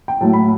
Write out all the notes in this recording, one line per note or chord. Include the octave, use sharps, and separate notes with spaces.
G5
A2 F#3 A3 A5
B5